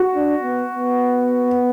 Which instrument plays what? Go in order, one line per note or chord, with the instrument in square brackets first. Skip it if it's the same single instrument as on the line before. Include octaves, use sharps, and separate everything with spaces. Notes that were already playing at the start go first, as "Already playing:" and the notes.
Already playing: [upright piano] F#4
[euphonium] D4
B3
B3